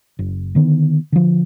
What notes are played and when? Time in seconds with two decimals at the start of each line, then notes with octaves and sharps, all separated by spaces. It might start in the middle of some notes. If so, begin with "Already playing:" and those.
0.19 F#1
0.55 D3 D#3 B3
1.12 D3 F3